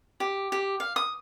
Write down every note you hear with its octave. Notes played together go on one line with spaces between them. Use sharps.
G4
G4
F5
D#6